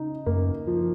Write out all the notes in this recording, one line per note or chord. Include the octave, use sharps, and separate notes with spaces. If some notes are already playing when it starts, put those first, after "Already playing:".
Already playing: C#3 D#4
F#2 A#3
F3